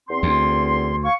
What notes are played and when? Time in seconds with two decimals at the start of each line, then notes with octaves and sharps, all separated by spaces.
0.08 E2 C4 C6
0.23 D2
1.04 F5 C#6